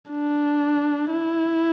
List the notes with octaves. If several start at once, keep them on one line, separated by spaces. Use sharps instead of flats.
D4
E4